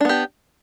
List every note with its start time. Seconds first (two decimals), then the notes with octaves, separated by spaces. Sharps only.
0.01 D4
0.05 B3
0.09 G4